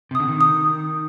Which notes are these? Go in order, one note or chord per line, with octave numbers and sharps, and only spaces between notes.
C3
D3 D#6
D#3
D#6